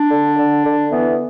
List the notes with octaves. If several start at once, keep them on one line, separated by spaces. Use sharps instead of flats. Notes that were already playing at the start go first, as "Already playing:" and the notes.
Already playing: D4
D3
D3
D3
E3 B3